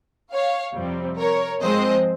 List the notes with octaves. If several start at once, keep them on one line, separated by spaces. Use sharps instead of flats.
C#5 F5
F2 C3 G3 C4
A#4 C#5
G#2 F3 G#3 C4 C5 D#5